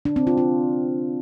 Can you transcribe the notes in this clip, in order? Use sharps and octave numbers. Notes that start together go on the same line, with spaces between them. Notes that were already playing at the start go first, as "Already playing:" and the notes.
D4
C4
F4
F4